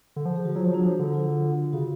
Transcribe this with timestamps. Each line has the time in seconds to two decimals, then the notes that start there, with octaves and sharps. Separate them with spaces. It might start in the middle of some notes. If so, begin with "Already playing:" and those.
0.16 D3
0.25 F3
0.36 G#4
0.45 F#4
0.55 F#3 F4
0.65 F3 F#4
0.74 F#3 D4
0.85 F3
0.99 D3
1.14 F4
1.73 C#3 F#4